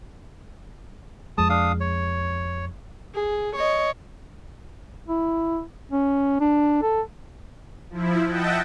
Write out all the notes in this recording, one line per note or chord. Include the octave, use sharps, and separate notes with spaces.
F2 G#3 A5 D#6
D4 F5 D#6
C#5
G#4
C#5 D#5
E4
C#4
D4
A4
F3 E4
D#5 E5 F#5 G5 A5